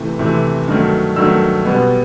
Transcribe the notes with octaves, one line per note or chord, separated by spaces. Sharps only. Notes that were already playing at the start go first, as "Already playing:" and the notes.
Already playing: C3 E3 A3
C3 E3 A3
G2 D#3 F#3 A3
G2 D#3 F#3 A3 E6
B2 G3 B3